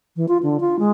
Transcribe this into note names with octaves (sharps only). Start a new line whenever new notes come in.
E3
F4
D3
F4
G#3